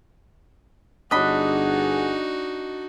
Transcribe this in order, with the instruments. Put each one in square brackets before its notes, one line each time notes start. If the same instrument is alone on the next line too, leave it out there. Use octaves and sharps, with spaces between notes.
[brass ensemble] G1 G#4 F#5 [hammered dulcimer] D4 [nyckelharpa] D#4 F#4 [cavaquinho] D#5 B5